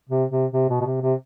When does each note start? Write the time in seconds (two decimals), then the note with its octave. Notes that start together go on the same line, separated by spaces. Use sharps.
0.09 C3
0.30 C3
0.53 C3
0.69 B2
0.81 B2
0.86 C3
1.02 C3